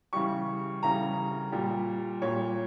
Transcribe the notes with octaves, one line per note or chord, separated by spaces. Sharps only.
C#3 E3 G3 C#6
C#3 E3 G3 A#5
A#2 G3
A#2 G3 C#5